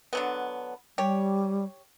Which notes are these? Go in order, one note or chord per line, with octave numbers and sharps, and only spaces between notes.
D3 F#3 B3
G3 G4 C#5